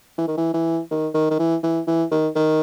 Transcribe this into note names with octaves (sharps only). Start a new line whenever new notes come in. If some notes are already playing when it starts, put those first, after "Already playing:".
E3
D#3
E3
E3
D#3
D#3
D#3
E3
E3
E3
D#3
D#3